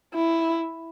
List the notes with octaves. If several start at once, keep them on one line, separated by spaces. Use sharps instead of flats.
E4